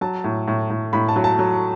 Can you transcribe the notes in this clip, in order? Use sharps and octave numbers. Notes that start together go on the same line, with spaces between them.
F#3 A5
A2
A2
A2
A2 B5
A5
F#3
A5
F#3